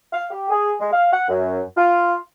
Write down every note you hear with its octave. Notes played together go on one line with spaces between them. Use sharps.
F5
G4
G#4
G#3
F5
F#5
F#2
F4